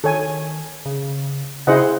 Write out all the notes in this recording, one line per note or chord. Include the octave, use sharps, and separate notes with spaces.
D#3 A4 C#5 G#5
C#3
C#3 E4 G#4 C5 D#5 F#5